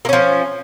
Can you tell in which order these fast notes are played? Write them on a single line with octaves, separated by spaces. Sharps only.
A#3 C#4 F3